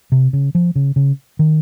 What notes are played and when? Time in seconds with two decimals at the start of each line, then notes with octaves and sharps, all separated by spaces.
0.12 C3
0.33 C#3
0.55 F3
0.75 C#3
0.96 C#3
1.39 D#3